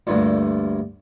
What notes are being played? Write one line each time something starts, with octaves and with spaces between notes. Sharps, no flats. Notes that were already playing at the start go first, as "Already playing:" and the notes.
D2 G2 A#2